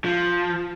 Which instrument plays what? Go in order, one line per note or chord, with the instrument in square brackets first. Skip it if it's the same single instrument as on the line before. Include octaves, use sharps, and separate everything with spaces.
[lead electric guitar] F3